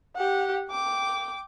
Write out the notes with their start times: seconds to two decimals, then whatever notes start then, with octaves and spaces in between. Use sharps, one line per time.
0.16 G4 F#5
0.69 G5 D6